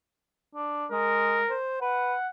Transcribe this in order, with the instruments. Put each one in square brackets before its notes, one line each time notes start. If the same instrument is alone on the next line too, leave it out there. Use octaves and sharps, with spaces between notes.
[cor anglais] D4
[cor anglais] G#3 [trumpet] A#4
[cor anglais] C5
[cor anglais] B4 [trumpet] F#5